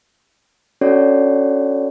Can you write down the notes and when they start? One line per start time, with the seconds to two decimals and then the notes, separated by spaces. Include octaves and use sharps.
0.81 C#4 D4 F#4 A4 C#5 D5